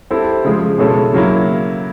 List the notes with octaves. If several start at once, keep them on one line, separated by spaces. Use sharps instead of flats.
G3 C4 E4 A4
C#3 F3 G#3
B2 G#3 C#4 E4 A4
C#3 F#3 A#3 C#4 E4